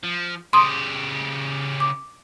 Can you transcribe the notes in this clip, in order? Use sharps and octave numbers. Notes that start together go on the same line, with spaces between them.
F3
C#3 G4 C6 D#6
D6